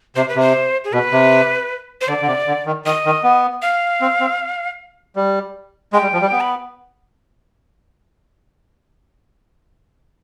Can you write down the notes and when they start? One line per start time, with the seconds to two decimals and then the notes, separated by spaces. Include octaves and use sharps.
0.16 C3 C5
0.29 B4
0.36 C3 C5
0.84 G#4
0.93 B2 B4
1.12 C3
2.01 C5
2.08 D3 D5
2.22 D3
2.28 C3
2.47 D3
2.66 D#3
2.85 D#3 D#5
3.05 D#3
3.23 B3
3.62 F5
4.01 C4
4.20 C4
5.16 G3
5.93 G#3 G5
6.02 G3
6.13 F3
6.22 G3
6.32 B3
6.40 B5